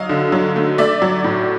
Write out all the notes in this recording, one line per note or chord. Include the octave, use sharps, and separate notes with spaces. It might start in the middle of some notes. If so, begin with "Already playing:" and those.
Already playing: F#3 D#5 F5
D3
F#3
A3
A3 D5 E5
F#3
A2